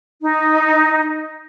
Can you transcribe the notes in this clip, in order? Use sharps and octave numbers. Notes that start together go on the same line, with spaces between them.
D#4